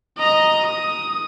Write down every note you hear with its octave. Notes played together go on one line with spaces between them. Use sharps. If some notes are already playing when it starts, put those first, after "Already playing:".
D#5 A#5
D#6